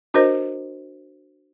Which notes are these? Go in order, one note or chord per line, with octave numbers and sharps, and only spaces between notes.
D4 F#4 A#4 C5 D#5